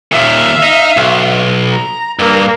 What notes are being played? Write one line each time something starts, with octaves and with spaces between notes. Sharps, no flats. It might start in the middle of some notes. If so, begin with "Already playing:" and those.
D#2 A#2 E5 F5
D#4
B1
A#5
G2 A#3